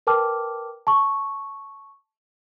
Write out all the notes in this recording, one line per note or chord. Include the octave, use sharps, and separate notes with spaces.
A#4 B4 G5 A5 D6 F6
A5 C#6